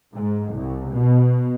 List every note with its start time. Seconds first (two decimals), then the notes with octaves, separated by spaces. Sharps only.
0.13 G#2
0.53 C2
0.93 B2